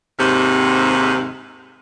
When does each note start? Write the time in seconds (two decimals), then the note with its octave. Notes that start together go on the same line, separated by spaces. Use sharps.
0.19 D#2 G#2 C3